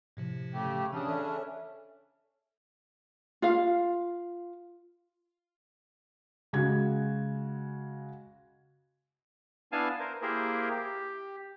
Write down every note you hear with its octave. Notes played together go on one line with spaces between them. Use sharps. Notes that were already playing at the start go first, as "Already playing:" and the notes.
A2 C3 F3
C#3 A3 G4
C#3 E3 C#4 D4 D#6
A4 C#5 E5
F4 F5
C#3 G#3 F#4 G#6
B3 D4 E4 F5 G#5 A5
A#4 C5
A#3 E4 G4 G#4 A#4 C5
G4